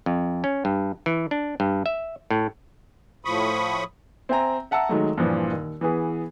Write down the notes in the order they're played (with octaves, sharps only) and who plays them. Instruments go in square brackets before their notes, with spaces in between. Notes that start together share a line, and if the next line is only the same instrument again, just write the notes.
[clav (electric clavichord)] F2
C#4
G2
E3
D4
G2
E5
A2
[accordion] A2 F3 B5 C#6 D#6
[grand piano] C4 E5 G5 G#5 A#5
E5 F#5 A5 A#5 E6
D#3 F#3 G#3 A3
G2 A#2 E3 F3
D#2
E3 B3 G#4